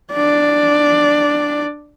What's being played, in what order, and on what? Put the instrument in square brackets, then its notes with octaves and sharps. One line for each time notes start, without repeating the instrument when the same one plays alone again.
[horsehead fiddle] D4 D5